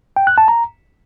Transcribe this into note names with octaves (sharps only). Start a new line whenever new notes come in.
G5
F#6
A5
A#5